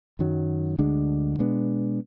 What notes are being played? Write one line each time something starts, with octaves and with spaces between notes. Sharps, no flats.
F#2 D#3 F#3
D2 D3 G#3 D4
B2 G#3 B3 D4